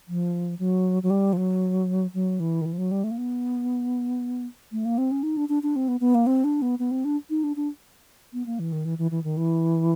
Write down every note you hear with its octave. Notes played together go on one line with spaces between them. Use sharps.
F3
F#3
F#3
G3
F3
F#3
F#3
E3
D#3
E3
F3
F#3
G3
A3
A#3
B3
A3
A#3
C4
C#4
D#4
D4
D4
D4
C4
B3
B3
A#3
C4
D4
B3
B3
C4
D4
D#4
D4
D4
B3
A#3
E3
D#3
E3
E3
E3
D#3
E3